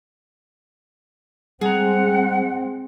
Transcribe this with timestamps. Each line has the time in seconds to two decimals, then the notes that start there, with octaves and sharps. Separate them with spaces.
1.61 G3 G#3 C4 G#4 F#5 A#5